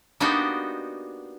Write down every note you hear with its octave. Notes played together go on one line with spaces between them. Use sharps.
A#3 B3 D4 D#4 F#4 G4